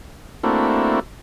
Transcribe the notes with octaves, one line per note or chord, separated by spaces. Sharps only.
A3 A#3 C4 D4 E4 F#4